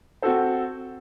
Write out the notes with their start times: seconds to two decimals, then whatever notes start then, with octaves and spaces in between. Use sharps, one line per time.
0.22 C4 F#4 A4 C5